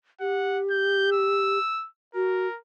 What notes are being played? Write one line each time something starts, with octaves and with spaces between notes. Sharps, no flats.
G4 F#5
G6
E6
F#4 A#4